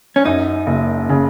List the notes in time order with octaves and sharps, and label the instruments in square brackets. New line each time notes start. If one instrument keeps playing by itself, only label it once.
[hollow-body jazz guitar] C#4
[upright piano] F#2 [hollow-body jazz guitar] D#4
[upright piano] F#1
C#3